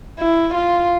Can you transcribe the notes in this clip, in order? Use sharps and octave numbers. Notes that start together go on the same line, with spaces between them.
E4
F4